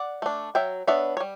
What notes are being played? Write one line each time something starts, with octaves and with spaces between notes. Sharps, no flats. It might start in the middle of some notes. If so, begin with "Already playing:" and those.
Already playing: D5 F#5
A3 D4
F#3 E5 G5
B3 D4 C#5 E5
C#5
G3